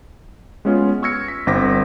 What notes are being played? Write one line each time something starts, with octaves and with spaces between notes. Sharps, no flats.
G#3 B3 C#4 F4
C#6 E6 F6 G#6 A#6 C#7
B6
G1 C4 F#5 D6 A#6 B6